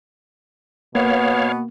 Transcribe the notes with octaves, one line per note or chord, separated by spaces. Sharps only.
B2 A#3 B3 C#5 F5